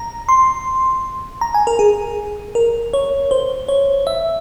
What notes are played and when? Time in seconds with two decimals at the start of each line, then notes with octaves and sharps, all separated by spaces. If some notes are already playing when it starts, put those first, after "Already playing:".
Already playing: A#5
0.29 C6
1.41 A#5
1.54 G#5
1.67 A#4
1.79 G#4
2.55 A#4
2.93 C#5
3.31 C5
3.68 C#5
4.07 E5